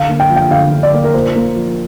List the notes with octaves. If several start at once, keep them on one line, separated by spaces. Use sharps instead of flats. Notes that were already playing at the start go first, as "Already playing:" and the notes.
Already playing: D3 F5
A#3
G5
F3
G5
D3 F5
D3
D5
A#3
A#4
A#2 C5
A#3
F3